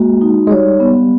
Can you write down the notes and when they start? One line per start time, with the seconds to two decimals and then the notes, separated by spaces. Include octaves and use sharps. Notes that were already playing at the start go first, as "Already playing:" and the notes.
Already playing: G#3 A#3 F#4
0.21 D#4
0.47 G#3
0.51 G3 C#5
0.80 B3